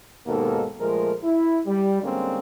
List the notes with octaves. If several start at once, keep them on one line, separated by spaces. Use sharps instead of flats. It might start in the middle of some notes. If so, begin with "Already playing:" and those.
D#2 G#2 B2 A#3 A4 A#4
A#2 F3 G#3 A3 A#4
E4
G3
D3 G3 G#3 A#3 C4 C#4